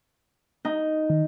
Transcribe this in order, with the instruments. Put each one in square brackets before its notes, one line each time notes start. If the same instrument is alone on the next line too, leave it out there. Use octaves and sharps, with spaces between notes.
[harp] D#4
[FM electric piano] D#3